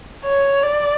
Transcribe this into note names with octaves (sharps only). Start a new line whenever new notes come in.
C#5
D5